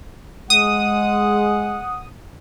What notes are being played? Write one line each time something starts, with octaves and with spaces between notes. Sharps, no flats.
G#3 F#5 D#6